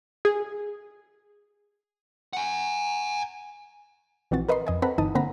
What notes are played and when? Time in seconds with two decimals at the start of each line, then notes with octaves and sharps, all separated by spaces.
0.25 G#4
2.33 F#5 G#5
4.31 A#1 E3 F3 C4 F#4 A6
4.48 A#4 B4 D#5 B5 C6
4.67 F2 D#5 G#5
4.82 C4 A4 B4 F#5 A#5 B5
4.98 G1 E3 D#4 A5 D#6
5.15 D3 A#3 C4 F#5 A#5 B5